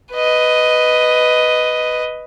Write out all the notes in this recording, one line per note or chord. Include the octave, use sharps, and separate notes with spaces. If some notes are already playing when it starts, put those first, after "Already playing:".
B4 D#5